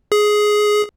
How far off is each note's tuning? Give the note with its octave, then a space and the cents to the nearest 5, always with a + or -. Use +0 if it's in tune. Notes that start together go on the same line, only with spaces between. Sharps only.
G#4 +10